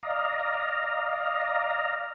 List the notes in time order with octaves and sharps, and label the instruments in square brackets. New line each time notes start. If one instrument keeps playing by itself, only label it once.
[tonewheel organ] D5 D#5 F5 A#5